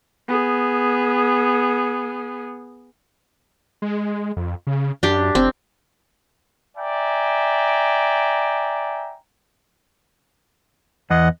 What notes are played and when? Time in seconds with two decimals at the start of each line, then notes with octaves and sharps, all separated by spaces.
0.28 B3 G#4
3.82 G#3
4.37 F2
4.67 C#3
5.03 F#2 D4 G4
5.35 F1 C4
6.77 D5 E5 G5 G#5 A#5
11.10 E2 D#5 F#5